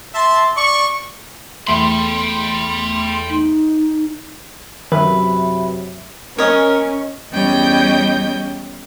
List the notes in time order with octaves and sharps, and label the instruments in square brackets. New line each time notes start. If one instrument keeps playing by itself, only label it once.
[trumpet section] E5 A5 C6
D5 C#6
[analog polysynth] E2 A3 C6 [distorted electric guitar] G5 B5
[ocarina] D#4
[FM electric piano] F#2 E5 [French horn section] C3 F#3 [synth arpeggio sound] D#3 [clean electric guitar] B4
[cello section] C#4 [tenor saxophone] A#4 [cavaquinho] C#5 D#5
[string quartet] E2 G3 C#4 D#5 G5 G6